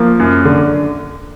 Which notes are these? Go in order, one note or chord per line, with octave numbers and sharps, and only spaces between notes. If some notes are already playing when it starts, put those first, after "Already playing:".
Already playing: F3 A#3
F#2
D3